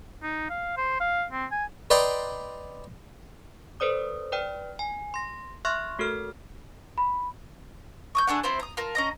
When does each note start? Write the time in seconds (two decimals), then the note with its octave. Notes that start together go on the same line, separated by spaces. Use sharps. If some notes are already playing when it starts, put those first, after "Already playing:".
0.23 D#4
0.50 F5
0.77 C5
1.00 F5
1.32 C4
1.51 G#5
1.90 B4 D5 D#5 G5 A#5 C6
3.80 A4 B4 C5 D5 D#6
4.32 B4 D5 G5 F6
4.79 G#5
5.14 C6 A#6
5.65 E5 C6 C#6 F6 F#6 A#6
5.99 A3 F#4 A4 A#4 F6
6.98 B5
8.15 C#6 D#6 G6
8.27 A3 D4 G#4 F#5
8.43 C4 E4 F4 C5
8.60 A#5 D#6
8.77 F4 A#4 A5
8.95 C#4 D#5 A#5